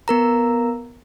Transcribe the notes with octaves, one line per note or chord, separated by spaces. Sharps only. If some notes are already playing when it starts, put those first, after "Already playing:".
B3 A#4 A#5